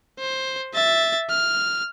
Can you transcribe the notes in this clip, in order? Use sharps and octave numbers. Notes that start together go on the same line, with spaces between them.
C5
E5 A6
F6